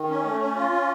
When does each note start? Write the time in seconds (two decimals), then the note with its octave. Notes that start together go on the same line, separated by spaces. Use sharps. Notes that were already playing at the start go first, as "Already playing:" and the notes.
Already playing: D#3
0.10 C#4
0.25 A3
0.40 C#4
0.56 F4
0.72 C#4